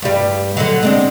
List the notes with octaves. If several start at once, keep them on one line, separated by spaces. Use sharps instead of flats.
G2 G3
D3 F#3
G#3 C4 D4